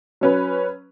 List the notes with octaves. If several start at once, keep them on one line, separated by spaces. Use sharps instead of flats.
F#3 C#4 B4